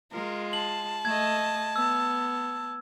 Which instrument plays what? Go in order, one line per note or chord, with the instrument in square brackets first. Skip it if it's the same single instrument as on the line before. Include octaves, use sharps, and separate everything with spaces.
[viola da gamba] G#3 F4 [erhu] A#4
[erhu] A5 [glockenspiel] F#7
[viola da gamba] A3 D#5 [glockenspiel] G#6
[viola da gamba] B3 [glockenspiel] E6